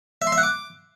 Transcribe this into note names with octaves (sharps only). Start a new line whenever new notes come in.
E5
C6
E5
F#5
D6